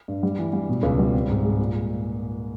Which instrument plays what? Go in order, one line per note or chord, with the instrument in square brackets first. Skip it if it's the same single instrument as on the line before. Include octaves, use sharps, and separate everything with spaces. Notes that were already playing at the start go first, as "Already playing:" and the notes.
[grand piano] G2
G3
E3
G3
B2
C#2
G3
C4
G#2
G#3
A#2